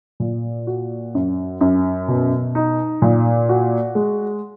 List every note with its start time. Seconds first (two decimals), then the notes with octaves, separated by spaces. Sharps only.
0.20 A#2
0.67 F#4
1.15 F#2
1.61 F#2
2.08 B2
2.55 D#4
3.02 A#2
3.49 F#4
3.95 G#3